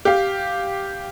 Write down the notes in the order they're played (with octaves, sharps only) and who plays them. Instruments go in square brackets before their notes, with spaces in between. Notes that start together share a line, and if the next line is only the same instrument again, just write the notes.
[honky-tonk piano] G4 F5